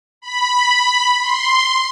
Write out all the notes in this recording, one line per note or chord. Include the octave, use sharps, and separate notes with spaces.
B5
C6